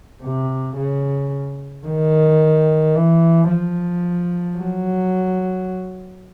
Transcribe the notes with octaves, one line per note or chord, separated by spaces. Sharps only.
C3
C#3
D#3
E3
F3
F#3